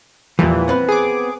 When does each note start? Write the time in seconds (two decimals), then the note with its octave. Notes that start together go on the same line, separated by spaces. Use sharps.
0.39 E2 A#2 E3 F3 G3
0.68 B3 C4 B4
0.89 G#4 D6